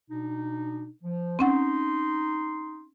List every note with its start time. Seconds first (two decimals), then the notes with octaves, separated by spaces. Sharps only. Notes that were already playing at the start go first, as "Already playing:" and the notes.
0.10 B2 D4 D#4
1.04 F3
1.39 C4 C#4 D#4 F#5 C6